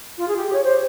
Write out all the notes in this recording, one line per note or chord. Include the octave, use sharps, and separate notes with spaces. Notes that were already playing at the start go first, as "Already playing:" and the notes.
F4
G#4
G4
C#5
C5